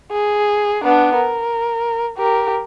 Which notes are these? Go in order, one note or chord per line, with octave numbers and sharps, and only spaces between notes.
G#4
B3 D4
A#4
G4 A#4